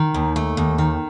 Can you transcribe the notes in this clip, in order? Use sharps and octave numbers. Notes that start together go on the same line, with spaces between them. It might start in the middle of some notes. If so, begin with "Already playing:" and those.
Already playing: D#3
D#2
A3
D#2
D#3